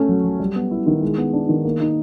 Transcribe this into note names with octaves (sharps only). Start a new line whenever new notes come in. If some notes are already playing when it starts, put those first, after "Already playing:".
Already playing: A3 C#4
F#3
F#3
G3
B3
E4
D#3
G#3
B3
D4
D#3
A#3
D#4